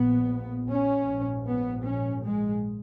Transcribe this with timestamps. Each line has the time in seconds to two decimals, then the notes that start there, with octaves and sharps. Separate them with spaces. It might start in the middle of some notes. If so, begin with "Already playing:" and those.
Already playing: A#1 A#2 B3
0.69 C#4
1.07 A#1 G#2
1.47 B3
1.85 C#4
2.24 G#3